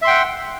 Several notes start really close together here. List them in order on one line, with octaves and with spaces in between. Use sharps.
E5 C6 G5 F#5